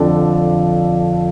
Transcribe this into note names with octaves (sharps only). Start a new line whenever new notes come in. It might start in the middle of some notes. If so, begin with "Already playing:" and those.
Already playing: F2 D3